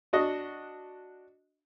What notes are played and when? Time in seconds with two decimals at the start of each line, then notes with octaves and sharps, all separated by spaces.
0.13 D4 F#4 D#5